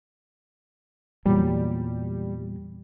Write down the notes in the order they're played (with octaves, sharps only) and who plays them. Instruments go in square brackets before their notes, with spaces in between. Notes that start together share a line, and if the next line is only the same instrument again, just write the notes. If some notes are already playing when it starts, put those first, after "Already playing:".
[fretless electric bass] E2 A#2 F#3 [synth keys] G3